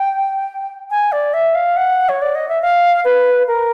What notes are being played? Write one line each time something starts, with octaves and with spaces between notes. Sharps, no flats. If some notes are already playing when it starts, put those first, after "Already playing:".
Already playing: G5
G#5
D5
E5
F5
F#5
C#5
D5
D#5
E5
F5
B4
A#4